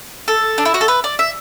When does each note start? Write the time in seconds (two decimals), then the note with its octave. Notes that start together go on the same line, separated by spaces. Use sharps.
0.28 A4
0.58 D4
0.65 E4
0.74 F#4
0.81 A4
0.88 B4
1.04 D5
1.19 E5